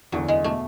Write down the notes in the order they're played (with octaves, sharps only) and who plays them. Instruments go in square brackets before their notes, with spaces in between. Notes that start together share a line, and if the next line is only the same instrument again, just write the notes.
[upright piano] F#1 E2 D3 [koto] F#3
[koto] G#3
[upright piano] B2 [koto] A3